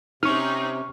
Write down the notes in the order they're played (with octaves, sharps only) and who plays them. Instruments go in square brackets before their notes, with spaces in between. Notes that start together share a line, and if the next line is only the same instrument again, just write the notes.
[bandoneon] C3 [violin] C4 C#4 [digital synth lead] D#4 [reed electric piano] C#6 F6